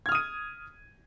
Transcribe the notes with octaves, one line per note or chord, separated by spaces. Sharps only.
D#6 F6 G#6 D#7